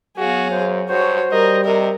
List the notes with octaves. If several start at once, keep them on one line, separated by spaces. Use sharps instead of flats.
F#3 B3 F#4 G#4 F5
F#2 C5
G2 F#4 C5 C#5
G3 A#4 D#5
C3 A#4 D#5